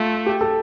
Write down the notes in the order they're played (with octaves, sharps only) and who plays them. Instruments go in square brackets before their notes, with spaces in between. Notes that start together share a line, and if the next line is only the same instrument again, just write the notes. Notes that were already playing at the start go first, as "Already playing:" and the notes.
Already playing: [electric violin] A3 [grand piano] F4
[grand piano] G4
A4